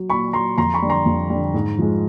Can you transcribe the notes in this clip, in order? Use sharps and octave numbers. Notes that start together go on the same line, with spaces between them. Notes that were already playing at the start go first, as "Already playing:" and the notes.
Already playing: F#3
A#2 B5 C#6
F#3 A#5 C6
F2 A#5 C6
B5 C#6
D3 G3
A#5 C6
F2
D3 G3
G#2
F3 G#3